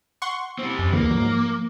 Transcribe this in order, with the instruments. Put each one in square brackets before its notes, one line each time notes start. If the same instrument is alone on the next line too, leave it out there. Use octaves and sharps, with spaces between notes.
[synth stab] F#5 C6 C#6
[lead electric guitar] G3 C4
[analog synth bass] F#2
[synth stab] D2 D3 [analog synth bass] E3 [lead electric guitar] A#3
[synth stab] G#2 F#3 [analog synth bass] F3